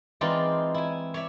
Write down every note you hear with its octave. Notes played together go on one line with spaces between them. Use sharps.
E3 G#3 C4 D#4 F4 D5
E4 G#5
C#5 D5 E5